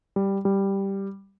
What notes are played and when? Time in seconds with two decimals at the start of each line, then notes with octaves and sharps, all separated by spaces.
0.16 G3
0.45 G3